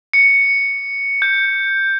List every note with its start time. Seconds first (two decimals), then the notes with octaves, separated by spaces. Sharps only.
0.13 C#7
1.22 G6